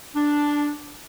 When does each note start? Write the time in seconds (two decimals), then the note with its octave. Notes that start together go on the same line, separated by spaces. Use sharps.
0.16 D4